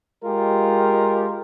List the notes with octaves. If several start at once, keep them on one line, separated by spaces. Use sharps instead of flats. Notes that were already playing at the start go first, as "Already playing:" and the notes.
G#3 F4 G4 A#4